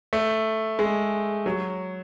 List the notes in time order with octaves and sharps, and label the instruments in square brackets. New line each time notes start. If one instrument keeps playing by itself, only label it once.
[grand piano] A3
G#3
F#3